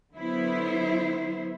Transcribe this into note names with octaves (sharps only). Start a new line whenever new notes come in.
D3 F#3 B3 E4 C5